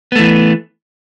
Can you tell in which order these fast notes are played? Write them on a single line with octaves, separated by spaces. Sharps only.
B3 A3 E3